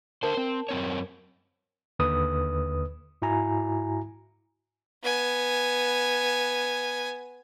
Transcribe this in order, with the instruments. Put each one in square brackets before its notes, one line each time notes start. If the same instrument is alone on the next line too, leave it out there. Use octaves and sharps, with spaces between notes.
[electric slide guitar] D3 C5 [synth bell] A#4 A5
[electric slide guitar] C4
F#2 C4 C#5
[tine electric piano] D#2 D3 B4 D#6
G#2 E4 F#4 G#5 A#5
[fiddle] B3 G#5